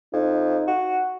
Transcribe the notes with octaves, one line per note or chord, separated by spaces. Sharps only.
F2 D#4
F#4